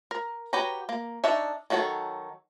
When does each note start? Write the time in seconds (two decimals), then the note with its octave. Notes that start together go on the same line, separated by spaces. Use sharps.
0.11 A#4
0.53 F#4 G4 B4 C#5 A#5
0.89 A#3
1.24 D4 D#4 C#5 E5
1.70 D#3 F#3 F#4 A4 C#5